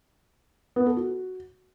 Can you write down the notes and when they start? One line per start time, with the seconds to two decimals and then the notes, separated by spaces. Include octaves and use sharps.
0.76 B3
0.86 A4
0.97 F#4